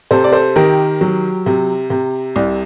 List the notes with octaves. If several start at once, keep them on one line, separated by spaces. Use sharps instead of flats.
C3 A4 C5
D5
A4 C5
D#3 G4 A#4
F#3
C3
C3
C2